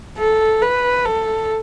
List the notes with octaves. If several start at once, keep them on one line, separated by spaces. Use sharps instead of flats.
A4
B4
A4